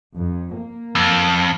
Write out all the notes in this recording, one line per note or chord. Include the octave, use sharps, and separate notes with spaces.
F2
A#3
F2